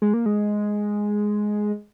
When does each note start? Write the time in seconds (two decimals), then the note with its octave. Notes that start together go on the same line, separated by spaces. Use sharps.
0.02 G#3
0.14 A#3
0.26 G#3